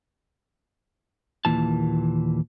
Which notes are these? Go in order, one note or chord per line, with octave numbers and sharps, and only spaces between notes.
D#2 A#2 E3 A5